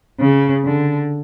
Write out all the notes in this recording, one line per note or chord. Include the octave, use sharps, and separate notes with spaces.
C#3
D3